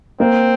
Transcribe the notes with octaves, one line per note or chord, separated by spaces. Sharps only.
A#3 C4